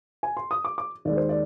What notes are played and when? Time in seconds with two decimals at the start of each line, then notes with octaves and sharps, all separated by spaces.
0.23 G#5
0.37 C6
0.51 D#6
0.65 D6
0.78 D6
1.05 D#2 D#3 G#3 D5
1.17 C5
1.29 D5